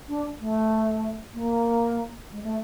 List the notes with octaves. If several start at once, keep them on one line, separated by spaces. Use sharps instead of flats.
D4
A3
A#3
G#3
A3